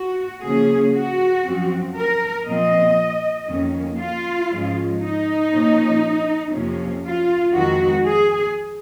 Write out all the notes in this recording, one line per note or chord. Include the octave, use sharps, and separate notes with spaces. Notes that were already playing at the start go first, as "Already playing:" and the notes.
Already playing: F#4
C#3 F3 A#3 C#4 G#4
F#4
F#2 F3 C4
A#4
A#2 F3 C4 D#5
F2 D#3 A#3 C#4
F4
G#2 F3 G#3 C#4
D#4
A#2 F3 A#3 C#4
F2 C3 F3 A#3 C#4
F4
F2 D#3 G#3 C4 F#4
G#4